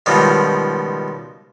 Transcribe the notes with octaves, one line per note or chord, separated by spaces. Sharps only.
C#2 B2 D#3 F3 G3